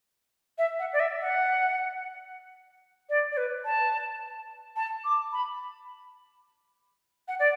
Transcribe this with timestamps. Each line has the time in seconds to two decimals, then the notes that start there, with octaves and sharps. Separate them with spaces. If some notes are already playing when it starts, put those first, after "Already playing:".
0.58 E5
0.79 F#5
0.93 D5
1.00 E5
1.21 F#5
3.10 D5
3.32 D5
3.37 B4
3.65 A5
4.76 A5
5.05 D6
5.33 B5
7.28 F#5
7.40 D5